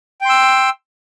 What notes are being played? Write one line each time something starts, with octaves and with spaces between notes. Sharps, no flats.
G5 C6 E6